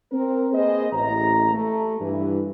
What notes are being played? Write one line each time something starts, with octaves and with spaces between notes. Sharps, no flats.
C4 A#4
A#3 G#4 B4 C5 D#5
A1 A#5
A3
G2 E3